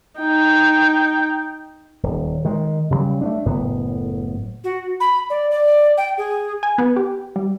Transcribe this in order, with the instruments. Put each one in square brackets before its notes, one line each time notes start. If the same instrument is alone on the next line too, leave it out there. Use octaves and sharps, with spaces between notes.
[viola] D#4 G5
[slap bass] D#1
D#3 G#3
C#3 E3 F#3 G3
A3 C4 D4
F#1 A2 B3
[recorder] F#4
B5
D5
D5
G5
G#4
[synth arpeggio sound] G#5
B3
G4
G3